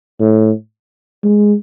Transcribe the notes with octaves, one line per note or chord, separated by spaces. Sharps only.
A2
G#3